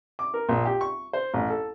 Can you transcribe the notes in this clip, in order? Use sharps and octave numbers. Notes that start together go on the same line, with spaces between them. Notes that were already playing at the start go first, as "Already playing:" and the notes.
D6
A#4
A#1
G4
C#6
C5
A1
A4